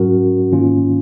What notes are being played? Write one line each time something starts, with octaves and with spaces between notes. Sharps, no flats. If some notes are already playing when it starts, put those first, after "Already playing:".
Already playing: G#2 F#3 C#4 F#4 A#4
G#2 D#3 A#3 C#4 F4